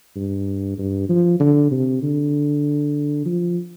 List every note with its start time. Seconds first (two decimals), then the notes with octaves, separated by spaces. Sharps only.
0.16 G2
0.78 G2
1.09 F3
1.40 D3
1.71 C3
2.02 D3
3.25 F3